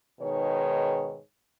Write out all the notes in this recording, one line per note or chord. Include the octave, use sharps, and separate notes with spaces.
G#2 B2 D#3 G#4 B4 C#5